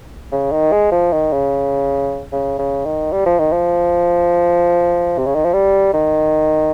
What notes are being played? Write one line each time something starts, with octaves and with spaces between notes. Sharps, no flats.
C#3
D#3
G#3
F3
D#3
C#3
C#3
C#3
D#3
G3
F3
D#3
F3
C3
C#3
D#3
F3
G3
D#3